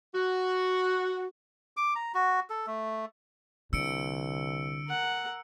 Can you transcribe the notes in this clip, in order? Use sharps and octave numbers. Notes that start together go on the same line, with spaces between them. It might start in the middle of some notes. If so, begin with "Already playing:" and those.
F#4
D6
A#5
F#4
A4
A3
C2 D3 E6 C#7 D7
A#4 F#5